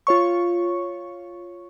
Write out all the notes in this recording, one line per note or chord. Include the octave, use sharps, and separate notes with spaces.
F4 C#5 C#6